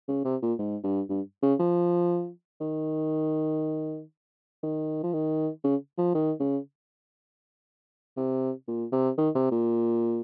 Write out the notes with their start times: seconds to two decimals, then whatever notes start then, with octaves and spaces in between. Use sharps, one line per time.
0.08 C#3
0.24 C3
0.42 A#2
0.59 G#2
0.83 G2
1.09 G2
1.42 C#3
1.59 F3
2.61 D#3
4.63 D#3
5.03 F3
5.13 D#3
5.64 C#3
5.98 F3
6.14 D#3
6.40 C#3
8.17 C3
8.67 A#2
8.92 C3
9.18 D#3
9.35 C3
9.51 A#2